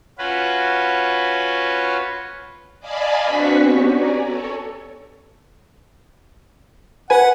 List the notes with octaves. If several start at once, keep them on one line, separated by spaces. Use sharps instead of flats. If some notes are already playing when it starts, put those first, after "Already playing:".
C#4 F4 F#4 B4
D5 D#5 F5 G#5 A5 B5
C4 D4 F#4 B4 C#6 B6
B3 C#4 F#4 G4
D5 G#5 A#5
A4 C#5
B4 F#5 G#5